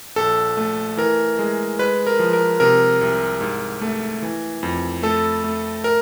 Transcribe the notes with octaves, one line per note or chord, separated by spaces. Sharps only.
A#1 A4
A3
E3 A#4
G#3
G#3 B4
A#4
F3
A#4
C3 A#4
C2
G#2
A3
E3
F2
A3 A4
A3
A#4